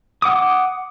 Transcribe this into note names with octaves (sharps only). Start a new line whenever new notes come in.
F#5 D6 D#6